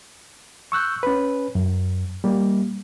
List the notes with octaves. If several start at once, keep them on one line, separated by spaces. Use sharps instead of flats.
C#6 E6 F#6 G6
C#4 B4
F#2
G3 A#3